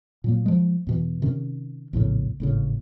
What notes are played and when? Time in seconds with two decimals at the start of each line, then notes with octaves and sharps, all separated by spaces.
0.24 A#2 F#3 A#3
0.46 F3 G#3
0.87 E2 B2 E3
1.22 C3 D#3 C#4
1.93 A#1 E2 A2 C#3
2.40 G#1 A2 C#3